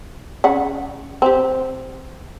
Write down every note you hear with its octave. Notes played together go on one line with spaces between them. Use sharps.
C#3 F#5
C4 G4